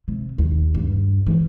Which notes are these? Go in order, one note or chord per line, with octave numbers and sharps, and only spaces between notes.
C3
D#2
G2
E3